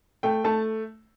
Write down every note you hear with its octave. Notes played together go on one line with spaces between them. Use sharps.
A3 G5
A3 A5